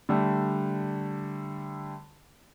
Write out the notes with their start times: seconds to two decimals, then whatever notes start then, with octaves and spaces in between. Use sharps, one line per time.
0.09 D3 G3 A3